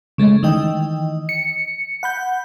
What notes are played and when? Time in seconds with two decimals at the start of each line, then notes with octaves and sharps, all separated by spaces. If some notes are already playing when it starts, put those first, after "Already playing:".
0.18 C#3 G#3 A3
0.43 D#3 E3 D#5 G5
1.29 C#7
2.03 F#5 B5 G6